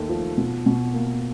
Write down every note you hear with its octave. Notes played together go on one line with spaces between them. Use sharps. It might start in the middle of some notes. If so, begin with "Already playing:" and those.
Already playing: D#2 A3
F3
B2
B2
A#3